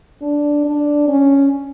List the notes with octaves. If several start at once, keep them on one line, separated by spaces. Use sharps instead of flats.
D4
D4
C#4